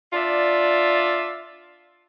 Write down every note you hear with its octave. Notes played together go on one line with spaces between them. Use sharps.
D4 F4 D5 E5